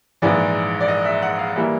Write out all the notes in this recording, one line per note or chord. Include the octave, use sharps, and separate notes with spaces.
A#1 G#2 E3 D5
D5
D#5
E5
F#5
F5
E3 G3 A#3 E5